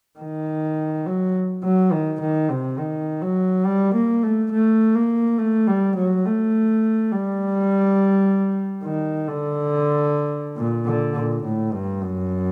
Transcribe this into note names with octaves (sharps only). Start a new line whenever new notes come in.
D#3
F#3
F#3
D#3
D#3
C3
D#3
F#3
G3
A#3
A3
A3
A#3
A3
G3
F#3
A3
G3
D#3
D3
A#2
D3
A#2
A2
G2
F#2